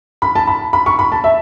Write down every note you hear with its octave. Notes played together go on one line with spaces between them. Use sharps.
B5
A5
B5
B5
C#6
B5
A5
E5